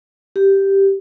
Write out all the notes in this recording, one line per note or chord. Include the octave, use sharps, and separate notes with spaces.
G4